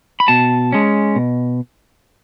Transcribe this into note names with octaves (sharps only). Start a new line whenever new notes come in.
B5
B2 A5
G#3 C#4
B2